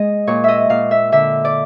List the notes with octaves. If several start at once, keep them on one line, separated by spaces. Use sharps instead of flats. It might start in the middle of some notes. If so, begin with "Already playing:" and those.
Already playing: G#3 D#5
A#2 C#5
D#5 E5
A#2 F5
E5
D3 E5
D5